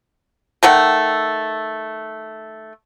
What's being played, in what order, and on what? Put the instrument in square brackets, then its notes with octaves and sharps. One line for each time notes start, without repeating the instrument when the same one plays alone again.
[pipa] D#3 A3 F#5 G5